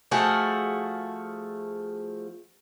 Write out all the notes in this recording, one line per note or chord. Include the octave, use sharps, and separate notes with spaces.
F3 A3 F#4 G#4